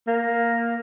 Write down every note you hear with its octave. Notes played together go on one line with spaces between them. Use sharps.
A#3